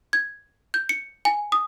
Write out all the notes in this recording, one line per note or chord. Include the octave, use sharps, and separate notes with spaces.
G#6
G6
C#7
G#5
D#6